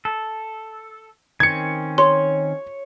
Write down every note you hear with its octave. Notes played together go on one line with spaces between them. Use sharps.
A4
D#3 C4 C#4 G#6 C#7
C#5 C6